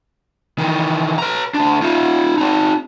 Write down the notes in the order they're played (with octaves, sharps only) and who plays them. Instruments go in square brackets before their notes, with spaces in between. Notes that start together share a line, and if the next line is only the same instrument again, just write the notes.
[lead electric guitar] D#3 E3
B4 A#5
D2 D4
D#4 F4
C4 D#4